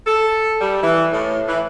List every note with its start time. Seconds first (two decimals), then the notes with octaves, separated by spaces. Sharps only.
0.07 A4
0.60 G3
0.83 E3
1.13 A2
1.48 E3